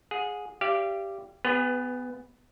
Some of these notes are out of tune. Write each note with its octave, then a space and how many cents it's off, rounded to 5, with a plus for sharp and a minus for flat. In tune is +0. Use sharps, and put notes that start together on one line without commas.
G#4 +0 F#5 -35
G4 +0 D5 +0 F5 -35
B3 +20 G#4 -30 B4 +0